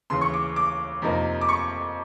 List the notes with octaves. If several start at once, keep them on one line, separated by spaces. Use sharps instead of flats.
D#2 C#3 E3 C6
C#6
D6
D6
F2 C3 F3 A#3 D#4
D6
C#6